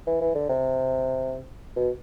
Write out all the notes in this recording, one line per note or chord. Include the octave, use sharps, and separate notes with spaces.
E3
E3
D3
C3
B2